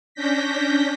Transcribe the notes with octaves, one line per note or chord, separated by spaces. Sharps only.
C#4 D4 G6 A#6 B6